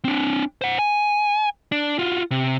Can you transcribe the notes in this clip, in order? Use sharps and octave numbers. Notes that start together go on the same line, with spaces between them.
C4 D4
C5 F#5
G#5
D4
F4 F#4
C3